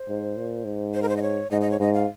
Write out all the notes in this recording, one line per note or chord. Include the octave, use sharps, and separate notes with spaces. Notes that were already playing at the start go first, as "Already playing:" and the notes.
Already playing: C5
G#2
A#2
G#2
C5
A#4
C5
D#5
C#5
G#2 D#5
D#5
C#5
G#2 D#5
F5